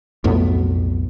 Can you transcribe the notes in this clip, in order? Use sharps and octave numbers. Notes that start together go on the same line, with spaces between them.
B1 F2 A2 B3